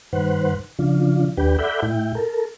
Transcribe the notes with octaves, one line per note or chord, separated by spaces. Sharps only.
G2 D#3 B4 C5 F#5
C#3 F3 D4 F4
D#2 D4 G4 B4 G5
A4 D5 E5 F#5 B5 G6
A2 E4 G5
A4 A#4